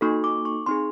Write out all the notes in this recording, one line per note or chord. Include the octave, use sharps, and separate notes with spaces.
A#3 D#4 F#4 A4 C#6
D6
C#6
C4 D#4 G#4 C6